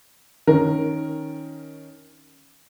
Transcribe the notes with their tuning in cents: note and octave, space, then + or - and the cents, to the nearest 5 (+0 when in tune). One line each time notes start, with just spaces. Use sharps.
D#3 +10 C#4 +0 A#4 +5